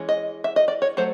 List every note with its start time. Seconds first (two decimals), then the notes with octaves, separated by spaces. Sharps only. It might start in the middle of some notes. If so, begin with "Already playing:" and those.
Already playing: E3 G#3 C#4
0.09 D#5
0.44 E5
0.56 D#5
0.68 D5
0.82 C#5
0.97 F#3 A3 C5